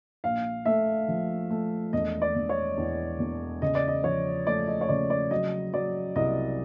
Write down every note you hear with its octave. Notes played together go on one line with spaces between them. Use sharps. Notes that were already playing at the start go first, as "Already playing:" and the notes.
A#1 F5
A3 E5
F3
A3
E1 D#5
D5
E1
C#5
E2
E1
C#3 D#5
D5
D#5
F3 C#5
A3 D5
D#5
C#5
C#3 D5
D5
F#3 D#5
F#3 D5
C2 D#5